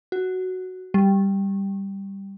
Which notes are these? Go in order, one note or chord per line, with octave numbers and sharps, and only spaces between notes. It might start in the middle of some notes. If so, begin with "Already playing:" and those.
F#4
G3